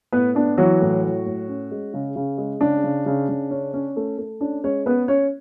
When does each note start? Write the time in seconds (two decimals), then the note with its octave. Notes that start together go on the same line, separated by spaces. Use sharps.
0.12 A2 B3 B4
0.35 B3 D4
0.58 E3 F#3 F#4
0.81 A2
1.03 F#3
1.26 A2
1.49 C#4
1.71 G#3
1.94 C#3
2.16 C#3
2.38 G#3
2.61 C#3 D4
2.84 C#3
3.06 C#3
3.29 C#3
3.51 C#4
3.74 C#4
3.96 A3
4.18 A3
4.41 C#4 D4
4.64 G#3 C#4 C#5
4.86 B3 C#4 B4
5.08 C#4 C#5